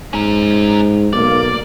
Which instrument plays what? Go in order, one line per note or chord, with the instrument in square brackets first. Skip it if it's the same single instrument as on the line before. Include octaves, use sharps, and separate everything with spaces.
[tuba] G#2 [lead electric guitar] C#4 A#4
[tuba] B1 [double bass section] A#3 [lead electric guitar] D5